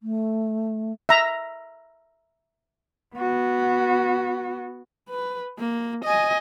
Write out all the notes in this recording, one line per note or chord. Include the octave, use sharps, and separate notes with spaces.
A3
E5 A#5
B3 F#4
B4
A#3
D#5 G#5